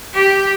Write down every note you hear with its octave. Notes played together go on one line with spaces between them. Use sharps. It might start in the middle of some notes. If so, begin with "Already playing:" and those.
G4